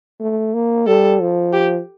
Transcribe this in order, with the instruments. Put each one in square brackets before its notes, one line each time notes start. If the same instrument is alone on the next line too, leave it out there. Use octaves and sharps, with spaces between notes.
[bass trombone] A3
A#3
[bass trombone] G3 [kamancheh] A4
[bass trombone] F3
[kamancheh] G4